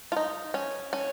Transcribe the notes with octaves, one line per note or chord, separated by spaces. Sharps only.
F4
D#4
C#4
C#4